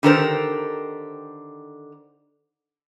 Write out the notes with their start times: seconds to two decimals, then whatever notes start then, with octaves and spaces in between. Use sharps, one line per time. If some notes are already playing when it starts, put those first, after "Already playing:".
0.03 D3 D#3 G4 A4 A#4 C5